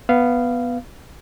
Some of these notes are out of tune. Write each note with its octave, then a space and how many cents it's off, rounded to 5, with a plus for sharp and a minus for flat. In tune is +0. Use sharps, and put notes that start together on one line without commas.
B3 +0 F5 -15